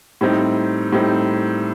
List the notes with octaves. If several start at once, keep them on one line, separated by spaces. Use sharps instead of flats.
A2 G3 C4 D#4
A2 G3 C4 D#4